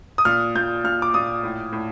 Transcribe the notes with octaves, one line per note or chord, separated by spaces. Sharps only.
D#6
A#2 F6
A#2 G6
A#2 F6
D6
A#2 D#6
A2
A2